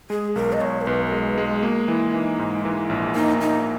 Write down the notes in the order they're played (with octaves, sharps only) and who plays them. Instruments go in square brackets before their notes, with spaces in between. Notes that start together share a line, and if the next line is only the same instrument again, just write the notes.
[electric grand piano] G#3 [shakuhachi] G#4
[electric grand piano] B1 [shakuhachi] A#4
[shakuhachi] D#5
[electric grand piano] B1 [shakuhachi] C#5
[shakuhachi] A#4
[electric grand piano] B1 [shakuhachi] B4
[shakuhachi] A#4
[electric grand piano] G#3
[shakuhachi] B4
[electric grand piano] G#3
[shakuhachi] G#4
[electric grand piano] A#3 [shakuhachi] F#4
[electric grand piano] E3 [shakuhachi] E4
[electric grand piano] E3 [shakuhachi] D#4
[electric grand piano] G#2
E3
A#1
[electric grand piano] A#3 [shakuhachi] D#4
[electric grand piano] A#3 [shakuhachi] D#4